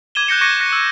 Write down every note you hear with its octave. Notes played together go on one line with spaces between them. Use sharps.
D6 G#6 D#7 E7 G7
F#6 G6 A#6 C#7
C#6 D6 A#6 C#7 D#7
F#6 A#6
E6